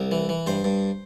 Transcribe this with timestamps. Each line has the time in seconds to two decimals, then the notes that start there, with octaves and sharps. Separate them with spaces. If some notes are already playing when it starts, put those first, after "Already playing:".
Already playing: C2 A#4
0.11 E3
0.29 E3
0.47 G2 C5
0.64 G2